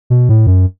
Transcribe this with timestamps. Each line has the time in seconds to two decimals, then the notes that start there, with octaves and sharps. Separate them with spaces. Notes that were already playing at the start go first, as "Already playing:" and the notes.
0.10 B2
0.29 A2
0.47 F#2